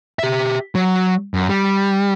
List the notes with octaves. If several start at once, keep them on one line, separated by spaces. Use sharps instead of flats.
G4 E5
F#3
F#2
G3